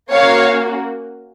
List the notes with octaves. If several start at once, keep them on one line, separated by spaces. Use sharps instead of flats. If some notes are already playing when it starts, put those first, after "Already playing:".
A#3 C#4 F#4 C#5 F5